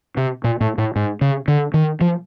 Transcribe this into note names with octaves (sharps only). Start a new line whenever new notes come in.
C3
A#2
A2
A2
G#2
C#3
D3
D#3
F3